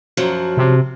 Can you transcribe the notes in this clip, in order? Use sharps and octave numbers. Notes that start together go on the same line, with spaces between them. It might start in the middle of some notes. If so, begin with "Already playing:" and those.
F#2 F3 F#3
C3